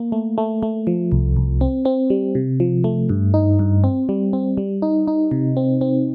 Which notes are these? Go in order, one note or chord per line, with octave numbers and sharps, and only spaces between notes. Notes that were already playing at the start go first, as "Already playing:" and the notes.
Already playing: A#3
A3
A3
A3
F3
C2
C2
C4
C4
G3
C3
F3
A3
G2
D#4
G2
C4
G3
C4
G3
D#4
D#4
C3
C4
C4